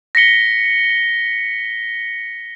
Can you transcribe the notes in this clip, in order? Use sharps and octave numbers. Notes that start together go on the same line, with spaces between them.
A#6 B6 C#7 G7